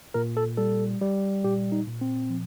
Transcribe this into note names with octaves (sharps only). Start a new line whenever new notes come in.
A#2 A#4
A4
G3 A4
G3
A#2 G4
D#4
A#2
C4
F3